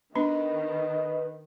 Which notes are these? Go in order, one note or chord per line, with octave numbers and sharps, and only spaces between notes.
D#3 B3 D4 B4 D#5